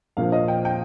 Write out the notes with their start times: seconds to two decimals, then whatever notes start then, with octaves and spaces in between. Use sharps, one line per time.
0.17 A#1 A#2 F3 F5
0.32 D#5
0.48 G5
0.65 G5